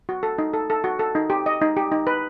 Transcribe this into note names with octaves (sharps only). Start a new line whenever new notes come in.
F#4
A4
D#4
A4
A4
F#4
A4
D#4
G4
D#5
D#4
G4
D#4
B4